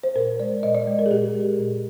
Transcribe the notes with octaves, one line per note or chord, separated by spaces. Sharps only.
C5
A#2 A#4
G#3 D5
A#2 D#5
D5
G#3
A#4
G#4
A#2 G4
G#3
A#2